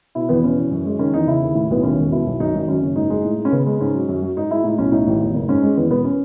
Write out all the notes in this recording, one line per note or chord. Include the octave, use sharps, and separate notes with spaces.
B2 E4
E2 B3
B2 C#4
E2
F#2
G#3
D#3 C#4
E2 D#4
C#3 E4
D#2
A2
B1 B3
D#2 C#4
E1
B2 E4
B1
F#2 D#4
G#1 D#4
F#2 C#4
F#1
G#2 D#4
G#3
A2
G#3
C#4
C#3 B3
G#3
G#2 C#4
F#3
F#2
F#3
G#2 D#4
G#3 E4
A2 D#4
B1 C#4
A2 D#4
A1
E2
F#1
G#2 C#4
G#3
E2 B3
E1 B3
C#4